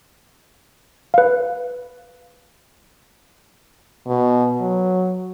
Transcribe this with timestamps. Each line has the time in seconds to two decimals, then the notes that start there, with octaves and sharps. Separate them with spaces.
1.14 B4 F5
4.07 B2
4.60 F#3